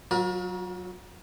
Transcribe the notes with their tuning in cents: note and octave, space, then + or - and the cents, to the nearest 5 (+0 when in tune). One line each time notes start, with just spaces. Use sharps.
F#3 +0 F4 +45 A#4 +35